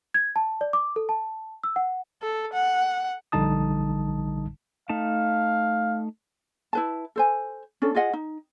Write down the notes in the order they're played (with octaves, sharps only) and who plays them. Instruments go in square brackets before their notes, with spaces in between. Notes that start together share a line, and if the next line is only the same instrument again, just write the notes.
[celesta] G#6
A5
D5
D6
A4
A5
E6
F#5
[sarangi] A4
F#5
[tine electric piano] A#1 D3 G3 D#4 A5 D#6
[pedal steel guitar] A3 D#4 A5 [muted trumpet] F5
[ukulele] E4 B4 A5
A4 C5 G#5
C#4 D4 A4
F4 G#4 D#5 F#5
D#4